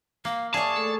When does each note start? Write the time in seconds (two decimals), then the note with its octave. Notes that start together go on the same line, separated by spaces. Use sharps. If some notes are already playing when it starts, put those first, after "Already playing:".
0.25 A#3 F5
0.54 G#4 C#5 D5 E5 F5 A5 D6
0.76 A3 A4